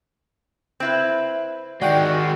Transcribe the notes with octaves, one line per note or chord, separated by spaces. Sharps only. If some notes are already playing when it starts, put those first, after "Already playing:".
C4 E4 B4
D#3 G#3 F#4 G4 D5 F#5 G5